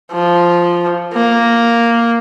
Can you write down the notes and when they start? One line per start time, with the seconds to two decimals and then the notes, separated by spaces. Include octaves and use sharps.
0.12 F3
1.13 A#3